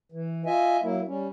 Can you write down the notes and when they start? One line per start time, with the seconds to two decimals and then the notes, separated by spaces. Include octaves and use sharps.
0.12 E3
0.46 F4 D#5 E5 G#5
0.83 F#3 A#3 E4
1.07 G3 C#4